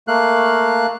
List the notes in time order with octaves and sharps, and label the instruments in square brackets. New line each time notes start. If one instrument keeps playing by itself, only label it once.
[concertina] A3 A#3 F5 F#6